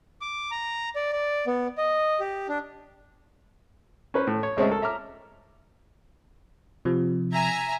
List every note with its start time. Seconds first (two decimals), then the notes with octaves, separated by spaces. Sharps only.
0.21 D6
0.51 A#5
0.96 D5
1.13 D5
1.47 B3
1.78 D#5
2.20 G4
2.49 D4
4.14 C#4 B4 C5
4.27 A2
4.43 C#5
4.57 C#2 G#3 A3 C4 C#4 E5
4.69 A4 A#4
4.82 E5 A#5 D6 F6
6.85 C3 F3
7.33 E5 G#5 A#5